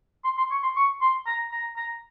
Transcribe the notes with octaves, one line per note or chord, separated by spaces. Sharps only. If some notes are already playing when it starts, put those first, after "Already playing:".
C6
C6
C#6
C6
C#6
C6
A#5
A#5
A#5